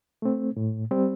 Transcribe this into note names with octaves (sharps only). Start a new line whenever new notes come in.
A3 C4
A2
G3 C4